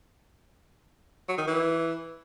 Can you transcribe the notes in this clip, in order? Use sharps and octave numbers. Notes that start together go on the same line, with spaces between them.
F#3
D#3
E3